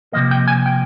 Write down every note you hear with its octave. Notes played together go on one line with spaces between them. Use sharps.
C3 F3 A#3 D#5
G5
G#5
G5